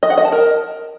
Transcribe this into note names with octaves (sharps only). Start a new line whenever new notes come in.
D#5
F#5
D#5
A5
A#4